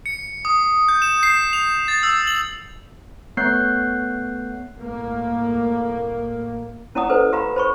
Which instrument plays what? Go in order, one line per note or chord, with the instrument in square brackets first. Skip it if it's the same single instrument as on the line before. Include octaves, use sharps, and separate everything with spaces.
[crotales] C#7
D#6
G6
E7
C7
F7
A6
E6
F#7
[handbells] A3 B3 C#5 F#6 G6 C7
[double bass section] A2 A#3
[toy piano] C#4 E4 D5 F#5 A#5 D#6
A4 B4 C5
G4 F5 A#5 B5
C5 B5 C#6